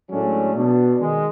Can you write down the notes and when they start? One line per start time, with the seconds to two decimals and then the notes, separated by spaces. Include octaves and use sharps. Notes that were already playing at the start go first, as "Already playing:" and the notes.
0.10 A2 F#3 G#3 A3 C#4 D4
0.55 B2 D4
0.99 D#3 G#3